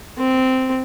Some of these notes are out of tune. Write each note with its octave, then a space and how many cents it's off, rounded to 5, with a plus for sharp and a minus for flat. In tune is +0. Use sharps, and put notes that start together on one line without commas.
C4 -10